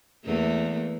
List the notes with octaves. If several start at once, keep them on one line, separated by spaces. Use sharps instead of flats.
E2 A3 A#3